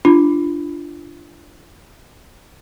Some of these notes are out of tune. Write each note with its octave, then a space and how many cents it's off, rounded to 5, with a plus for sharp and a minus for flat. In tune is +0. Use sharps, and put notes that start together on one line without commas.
D4 +0 F4 -30